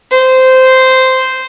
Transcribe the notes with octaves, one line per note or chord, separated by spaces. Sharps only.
C5